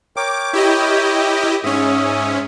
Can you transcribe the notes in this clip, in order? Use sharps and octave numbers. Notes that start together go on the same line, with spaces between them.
A#4 C#5 G5 D6
E4 G4 D#5
G#2 C#4 E5 D#6